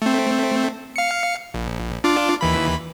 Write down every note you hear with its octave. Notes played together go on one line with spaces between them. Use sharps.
A3 C4
F5 C#7
A#1
D4 F4 D6
D#2 E3 B5